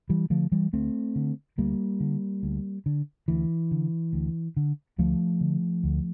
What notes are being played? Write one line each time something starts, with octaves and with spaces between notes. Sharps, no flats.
E3 G3
D3 F3 A3
E3 G3
D2 A3 C4
D3
D2 G3 A#3
D3
D2
D3
D2 E3
D3
D2
D3
D2 F3 A3
D3
D2